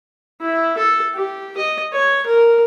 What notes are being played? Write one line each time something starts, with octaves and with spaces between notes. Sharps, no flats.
E4
A4
G4
D#5
C#5
A#4